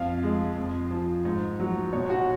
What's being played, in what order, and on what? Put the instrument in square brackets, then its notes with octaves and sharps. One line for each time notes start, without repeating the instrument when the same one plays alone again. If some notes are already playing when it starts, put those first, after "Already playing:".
Already playing: [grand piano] F2 F5
G#3
F2
F3
G#2
F#3
B2 C#5
F#4